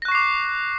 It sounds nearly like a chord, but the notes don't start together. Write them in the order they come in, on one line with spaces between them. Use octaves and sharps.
A#6 F#6 C#6 C7 D6